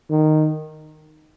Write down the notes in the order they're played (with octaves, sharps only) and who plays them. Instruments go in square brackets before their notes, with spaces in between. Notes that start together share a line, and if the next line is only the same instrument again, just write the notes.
[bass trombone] D#3